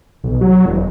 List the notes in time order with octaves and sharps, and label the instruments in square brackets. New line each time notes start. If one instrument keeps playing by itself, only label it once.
[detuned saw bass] B1
F#3
E1